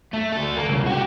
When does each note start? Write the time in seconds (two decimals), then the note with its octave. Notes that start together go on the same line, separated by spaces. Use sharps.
0.13 A3
0.33 D2 A4
0.56 A#3
0.69 C2 C#3
0.87 F#4 G4